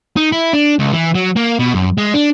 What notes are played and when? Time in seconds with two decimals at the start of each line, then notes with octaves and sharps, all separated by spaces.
0.16 D#4
0.32 E4
0.53 D4
0.79 C#2
0.93 E3
1.15 F#3
1.37 A#3
1.59 B2
1.74 F#2
1.98 G#3
2.14 D4